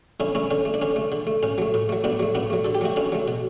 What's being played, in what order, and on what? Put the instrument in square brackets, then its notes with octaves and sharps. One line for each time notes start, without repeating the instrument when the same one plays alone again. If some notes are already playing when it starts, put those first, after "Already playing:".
[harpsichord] D3 C#4 E4
A3 C#4 E4
D3 C#4
A3
D4
D3 C#4
A3
D3
A3
A2 C#4
F#3 A3
A2
F#3 A3
A2 B3 D4
F#3 A3
A2 B3 D4
F#3 A3
D3 A4
G4
F#3 A3 F#4
D3 C#4 E4
F#3 A3
B2